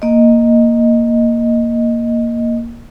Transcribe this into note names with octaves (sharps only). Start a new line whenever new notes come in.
A#3 D#5